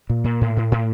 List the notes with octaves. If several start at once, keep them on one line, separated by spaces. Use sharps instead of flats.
A#2
A#2
A2
A2
A2